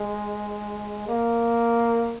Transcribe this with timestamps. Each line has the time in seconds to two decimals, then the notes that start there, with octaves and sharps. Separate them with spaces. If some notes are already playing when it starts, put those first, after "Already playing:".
Already playing: G#3
1.08 A#3